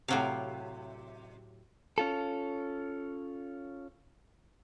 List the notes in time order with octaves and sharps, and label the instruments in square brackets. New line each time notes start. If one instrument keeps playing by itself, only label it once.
[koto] A2 F#3 F5 [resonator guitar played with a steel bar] C3
[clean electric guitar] C#4 F4 A4